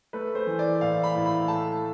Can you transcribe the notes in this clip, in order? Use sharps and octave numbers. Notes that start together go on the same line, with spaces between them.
A3 B4
C5
E3
D5
A2 F5
B5
A2
B5
A3 A5